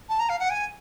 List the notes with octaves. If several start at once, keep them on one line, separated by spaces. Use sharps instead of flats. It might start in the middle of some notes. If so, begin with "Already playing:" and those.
A5
A#5
F5
F#5
G#5